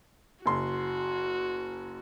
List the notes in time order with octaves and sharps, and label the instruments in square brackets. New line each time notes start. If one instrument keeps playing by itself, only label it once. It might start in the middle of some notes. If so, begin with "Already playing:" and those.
[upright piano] F#1 C6 [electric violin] F#4